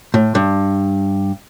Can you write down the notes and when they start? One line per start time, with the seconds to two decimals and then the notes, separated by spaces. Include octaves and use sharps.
0.14 A2
0.35 G2